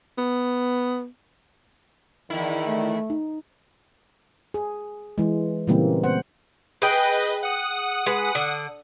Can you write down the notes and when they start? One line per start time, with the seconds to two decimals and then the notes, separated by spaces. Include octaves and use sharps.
0.18 B3
2.30 E2 D#3 E4
2.66 A3
3.10 D#4
4.54 G#4
5.18 E3 G#3
5.67 A#2 C#3 E3 G3 A#3 C4
6.04 B3 C5 F#5
6.82 G#4 B4 D#5 G5
7.43 F#5 D#6
8.06 G#3 B4
8.35 D3